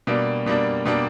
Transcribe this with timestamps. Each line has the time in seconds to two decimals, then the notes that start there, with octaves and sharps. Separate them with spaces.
0.07 B2 G3 A#3 D4
0.46 B2 G3 A#3 D4
0.85 B2 G3 A#3 D4